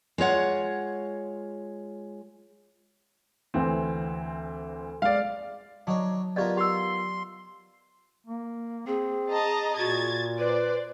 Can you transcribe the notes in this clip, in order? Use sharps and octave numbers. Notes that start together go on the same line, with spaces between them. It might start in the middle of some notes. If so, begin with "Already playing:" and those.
G#3 F4 C#5 F#5
D2 E3 C4
G#3 D5 F5
F#3 D4 D#4 C#5
B3 F4 G4 A#4 D5 D#5
G4 F5 C6 E6
A#3
C4 G#4
D#5 A5 A#5
A#2 F#4 G#6 A6
B4 C5 D5